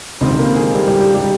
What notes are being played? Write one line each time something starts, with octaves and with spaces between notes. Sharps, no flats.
C#2 C3 D#3 C4 C5
A#3 A#4
G#3 G#4
G3 G4
G3 G4
G3 G4
G3 G4